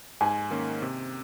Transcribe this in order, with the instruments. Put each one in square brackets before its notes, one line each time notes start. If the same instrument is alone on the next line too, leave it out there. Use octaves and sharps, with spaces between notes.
[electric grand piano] G#2 [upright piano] G#5
[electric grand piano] D#3 A#3 C#4
C3